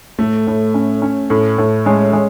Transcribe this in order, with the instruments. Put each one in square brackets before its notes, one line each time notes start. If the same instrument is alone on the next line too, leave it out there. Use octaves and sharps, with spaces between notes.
[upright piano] A2 [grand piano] A3
[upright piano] A2
C#4
C#4
A2
A2
[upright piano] G#3 [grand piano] C#4
[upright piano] G#3